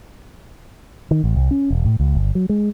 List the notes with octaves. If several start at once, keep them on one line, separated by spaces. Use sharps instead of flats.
D#3
A1
C2
C#4
E1
A2
C#2
G1
F#3
G#3